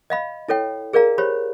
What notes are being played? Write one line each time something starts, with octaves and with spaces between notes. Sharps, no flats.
D#5 F5 B5
E4 A4 C#5 G5
G#4 A#4 D5 F5 A#5
G4 C5 C#5 B5